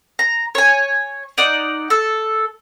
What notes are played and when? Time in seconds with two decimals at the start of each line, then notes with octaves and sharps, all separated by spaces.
0.19 A#5
0.55 C#5 G#5
1.38 D#4 D5 F#5
1.90 A4 E6